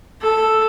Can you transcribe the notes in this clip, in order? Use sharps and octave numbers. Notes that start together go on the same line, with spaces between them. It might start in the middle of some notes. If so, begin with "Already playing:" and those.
A4